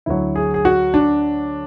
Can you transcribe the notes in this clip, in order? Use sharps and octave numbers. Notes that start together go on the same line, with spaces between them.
D2 D3 F#3 E4
G#4
G#4
F#4
D4